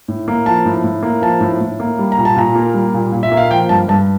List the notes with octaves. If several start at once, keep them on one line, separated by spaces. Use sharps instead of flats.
A2
A#3
F3 A5
A2
A2
A#3
F3 A5
A2
A2
A#3
G3
A#5
A#2
A5
A#2 A#5
A#3
G3
A#2
A#2
E5
A#3
F5
F3 G5
G2 A5
G2 A5